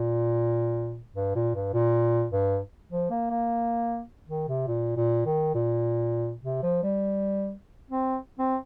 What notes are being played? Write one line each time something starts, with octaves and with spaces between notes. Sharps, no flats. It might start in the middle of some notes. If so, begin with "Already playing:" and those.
Already playing: A#2
G2
A#2
G2
A#2
G2
F3
A#3
A#3
D#3
C3
A#2
A#2
D#3
A#2
C3
F3
G3
C4
C4